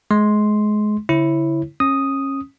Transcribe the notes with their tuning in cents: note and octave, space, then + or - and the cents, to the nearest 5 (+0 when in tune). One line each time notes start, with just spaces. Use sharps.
G#3 +25 C6 +0
D3 -45 E4 +0 C#5 -35
C#4 -25 D#6 +0